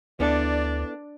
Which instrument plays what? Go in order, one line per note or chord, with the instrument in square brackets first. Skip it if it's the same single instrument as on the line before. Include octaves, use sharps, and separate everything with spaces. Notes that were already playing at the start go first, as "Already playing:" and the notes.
[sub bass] D2 [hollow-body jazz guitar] B3 E4 A4 [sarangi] D4 [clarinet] D5